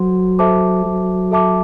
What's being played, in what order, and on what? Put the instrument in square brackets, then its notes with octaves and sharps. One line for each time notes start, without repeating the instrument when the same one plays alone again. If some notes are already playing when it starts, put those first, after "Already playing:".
Already playing: [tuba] F#3 [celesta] A4 C5 F#5 C6
[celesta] A4 C5 E5 A5 D6
[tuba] F#3
[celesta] A4 E5 A5 D6